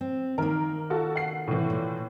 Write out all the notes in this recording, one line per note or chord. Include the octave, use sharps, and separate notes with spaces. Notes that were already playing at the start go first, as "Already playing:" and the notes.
C4
D#3 A#3 A#4
F4 F#4 A4
F#5 C7
A2 E3
A#2